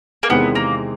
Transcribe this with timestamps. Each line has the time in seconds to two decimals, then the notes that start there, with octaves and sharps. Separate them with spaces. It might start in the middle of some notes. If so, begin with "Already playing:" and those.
0.23 A#3
0.29 E2 C3 D#3 G#3 B3 C4
0.55 A#3